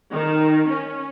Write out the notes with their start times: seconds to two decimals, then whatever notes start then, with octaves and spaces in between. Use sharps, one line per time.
0.11 D#3
0.68 C#4